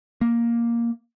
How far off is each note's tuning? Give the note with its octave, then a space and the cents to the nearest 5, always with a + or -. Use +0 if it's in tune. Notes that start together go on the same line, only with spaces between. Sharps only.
A#3 +5